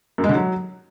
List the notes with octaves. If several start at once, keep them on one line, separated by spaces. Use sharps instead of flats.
F#2
G#3
D3
F#3